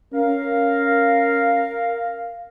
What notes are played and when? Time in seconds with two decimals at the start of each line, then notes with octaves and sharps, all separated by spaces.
0.13 C#4 A#4 F5